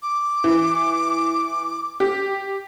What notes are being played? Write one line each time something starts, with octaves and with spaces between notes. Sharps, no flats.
D6
E3
G4